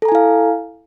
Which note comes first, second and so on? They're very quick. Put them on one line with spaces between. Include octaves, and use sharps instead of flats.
A4 A#5 G#5 E4 F5